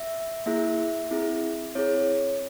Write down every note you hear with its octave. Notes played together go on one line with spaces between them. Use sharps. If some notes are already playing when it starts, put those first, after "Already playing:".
Already playing: E5
A#3 E4 G#4 E5
C4 E4 G#4
C4 E4 G#4 C#5